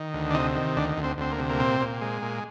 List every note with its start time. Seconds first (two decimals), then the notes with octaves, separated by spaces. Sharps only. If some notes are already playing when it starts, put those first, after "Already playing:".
Already playing: D#3
0.14 D2
0.31 D4
0.34 C3 D#4
0.55 D#3
0.76 D2 D4
0.97 D2
1.04 C4
1.18 D2 C4
1.32 A#3
1.38 C3
1.49 A#3
1.59 A#2 C4
1.81 A#2
2.01 G#3
2.22 A#2